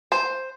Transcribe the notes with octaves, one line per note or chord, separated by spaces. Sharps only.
C5